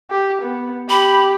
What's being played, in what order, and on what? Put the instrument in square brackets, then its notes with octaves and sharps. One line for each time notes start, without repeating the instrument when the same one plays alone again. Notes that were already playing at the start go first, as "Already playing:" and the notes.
[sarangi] G4
B3
[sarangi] G4 [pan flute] B5